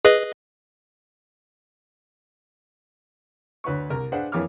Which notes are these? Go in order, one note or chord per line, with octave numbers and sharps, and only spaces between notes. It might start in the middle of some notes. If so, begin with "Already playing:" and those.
G#4 B4 D#5
D2 B4 C#5 C#6
C2 A#4
D4 G#4 B4 C5 F5 F#5
F2 E3 A#3 C#5 D6 F6